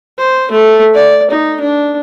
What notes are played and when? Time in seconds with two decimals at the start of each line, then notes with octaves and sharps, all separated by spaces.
0.19 C5
0.51 A3
0.94 D5
1.31 D#4
1.61 D4